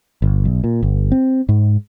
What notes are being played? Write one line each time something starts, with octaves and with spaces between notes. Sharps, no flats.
G1
B1
A#2
G1
C4
G#2